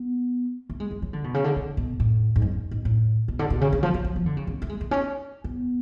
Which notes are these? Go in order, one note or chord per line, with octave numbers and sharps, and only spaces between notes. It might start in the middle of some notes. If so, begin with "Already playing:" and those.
Already playing: B3
A3
G#3
G#3
F#3
D3
B2
C#3
D3
C#3
B2
A2
G#2
F#2
G#2
A2
B2
D3
B2
C#3
D3
F3
F#3
F#3
F3
D3
C#3
C#3
A3
G#3
A3
C#4
B3